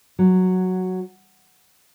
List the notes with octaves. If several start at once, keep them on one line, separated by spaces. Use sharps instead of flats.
F#3